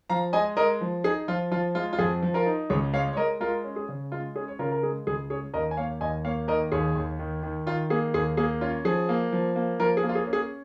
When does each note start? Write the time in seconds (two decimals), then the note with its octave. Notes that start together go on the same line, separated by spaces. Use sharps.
0.10 F3 F5 A#5
0.33 G#3 D#5 G#5
0.57 G#3 A#4 D#5
0.81 F3
1.04 D#4 G#4
1.28 F3 F4
1.51 F3 F4
1.75 G#3 F4
1.93 F4
1.99 F2 G#4
2.22 F3
2.34 F4 A#4
2.46 D#4
2.70 C#2 G#4 C#5
2.93 G#3 C#5 F5
3.13 C#5
3.17 G#3 A#4 D#5
3.40 G#3 F4 A#4
3.64 C#4
3.76 G#4
3.89 C#3
4.12 G#3 F4
4.36 C#4 G#4
4.48 C#5
4.59 C#3 F4 A#4
4.72 A#4
4.83 G#3 G#4
5.07 C#2 G#4
5.30 C#4 G#4 C#5
5.54 D#2 A#4 D#5
5.71 G#5
5.77 A#3 C#5 F5
6.01 D#2 D#5 G#5
6.25 A#3 C#5 F5
6.48 D#3 A#4 D#5
6.72 D#2 G#4 C#5
6.96 D#2
7.19 D#3
7.43 D#3
7.66 D#3 F4
7.90 A#3 G#4
8.14 D#2 G#4
8.37 A#3 G#4
8.61 C#4 F4
8.85 F3 G#4
9.09 A#3
9.32 F3
9.56 A#3
9.79 F3 F4 A#4
9.97 G#4
10.03 A#3
10.09 F4
10.15 G#4
10.27 C#4
10.33 G#4